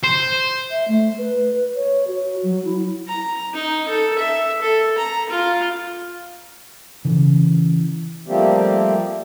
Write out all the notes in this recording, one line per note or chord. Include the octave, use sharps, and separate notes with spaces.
C5
E5
A3
B4
C#5
F#4
F#3
E4
A#5
D#4
A4
E5
A4
A#5
F4
C#3 E3
F3 G3 A3 A#3 C4 G4